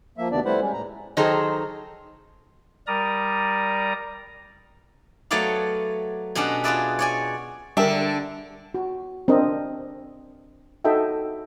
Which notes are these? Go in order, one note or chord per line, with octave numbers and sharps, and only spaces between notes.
F3 A#3 E5
D2 C3 D#3 B3 D4 D5
G3 A3 E4 B4 C5 F#5
G3 G#3 C#4
A2 A#5
D#3 F#3 D#4 G#4 A4 C5
G3 A#4 D5 A#5 D#6
F#3 A3 B3 C#5 D5 F5
B2 C#4 D4 F#4 G4
F4 F#4 G#4 B4 D5 E5
C#5 D5 G#5
D3 G3 D4 G4 G#4 A#4 E5
F#4
C4 D4 A#4 D#5
D#4 F#4 A4 D#5 E5 G5